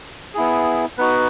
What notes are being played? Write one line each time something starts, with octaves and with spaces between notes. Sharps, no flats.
B3 E4 G#4
B3 D#4 F#4 B4